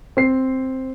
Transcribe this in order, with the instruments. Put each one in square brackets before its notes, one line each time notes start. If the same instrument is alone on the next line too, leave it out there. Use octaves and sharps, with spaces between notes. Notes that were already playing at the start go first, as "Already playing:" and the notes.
[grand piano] C4 C7